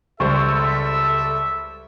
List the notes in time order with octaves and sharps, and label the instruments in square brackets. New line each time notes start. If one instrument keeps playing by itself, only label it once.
[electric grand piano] C#2 G3 C5 [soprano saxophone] A4 [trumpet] E5 [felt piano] C#6